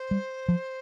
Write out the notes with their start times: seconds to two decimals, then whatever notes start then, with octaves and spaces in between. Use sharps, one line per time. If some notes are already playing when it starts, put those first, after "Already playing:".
Already playing: C5
0.11 G3
0.49 F3